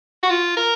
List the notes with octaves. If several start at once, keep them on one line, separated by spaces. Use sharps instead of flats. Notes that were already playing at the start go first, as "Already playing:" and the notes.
F#4
F4
A#4